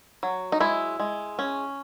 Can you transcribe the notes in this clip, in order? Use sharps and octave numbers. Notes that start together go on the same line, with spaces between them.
F#3
D#4
G#3 E4
G#3
C#4